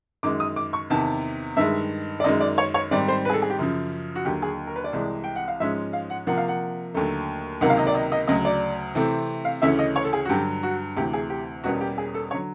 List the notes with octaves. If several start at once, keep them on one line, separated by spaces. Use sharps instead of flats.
F#2 D#3 G#3 D6
D#6
D6
C#6
E2 C3 D#3 A5
G2 D#3 G#3 E5
D5
F#2 D#3 G#3 D#5
D5
C#5
C#5
G#2 D#3 G3 C4 D5
C5
B4
G#4
A4
G#4
G4
F#2 C#3 F3
F#4
D#2 D3 F#3 G4
G#4
A#4
B4
D5
C2 C3 E3 G#3
G5
F#5
F5
G#2 F3 G#3 C#4 E5
F5
F#5
C3 F3 A#3 F#5
F5
F#5
D#2 D3 F#3 A3
C#2 C3 D#3 F#3 A#3 F#5
F5
D#5
D5
D#5
D#5
D2 C#3 F#3 D#5
D5
C3 E3 A3 C4
F5
D2 C#3 E3 A3 C#4 E5
D#5
C#5
A4
G#4
F#4
G2 D3 F#3 G4
F#4
D2 C3 E3 G4
G#4
G4
E2 B2 G3 A#3 C#4 F#4
G4
G#4
A4
D3 F#3 C#5